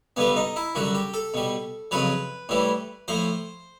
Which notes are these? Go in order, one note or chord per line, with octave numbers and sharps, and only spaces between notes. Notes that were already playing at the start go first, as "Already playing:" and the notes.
G2 D3 G3 B3
D#4
E4
F#2 D3 G3 F#4
G4
A4
B2 G3
F2 C#3 F#3 B4
A2 E3 G3
A2 F3 C5